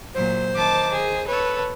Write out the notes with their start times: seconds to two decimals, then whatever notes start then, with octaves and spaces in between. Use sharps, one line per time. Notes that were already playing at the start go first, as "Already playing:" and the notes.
0.14 A#2 F#3 C5
0.55 D#3 A5 D6
0.92 G#4
1.27 A4 B4 C#5